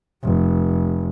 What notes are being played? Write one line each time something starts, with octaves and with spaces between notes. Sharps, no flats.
F1